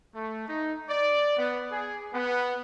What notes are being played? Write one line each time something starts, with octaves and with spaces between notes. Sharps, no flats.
A3
D#4
D5
B3
G#4
B3